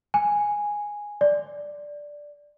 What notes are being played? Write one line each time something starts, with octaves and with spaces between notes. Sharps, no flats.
G#5
D5